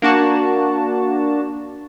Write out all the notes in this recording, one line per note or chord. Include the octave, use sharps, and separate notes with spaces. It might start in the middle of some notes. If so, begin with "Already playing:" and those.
A#3 D4 F#4 A5